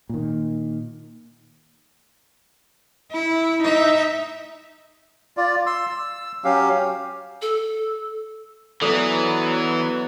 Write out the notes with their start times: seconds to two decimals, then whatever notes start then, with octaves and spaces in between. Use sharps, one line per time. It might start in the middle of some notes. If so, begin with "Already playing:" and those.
0.09 A#2 D#3
3.12 E4
3.63 D#4 E5
5.37 F4 D5
5.66 C6 E6
5.89 E6
6.44 F#3 C#4 G4 F5
7.42 A4
8.82 E3 F#3 B3 A4 D5 D#6